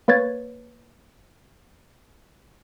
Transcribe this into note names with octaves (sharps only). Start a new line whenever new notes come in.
A#3 B4 C#5 G#6 A6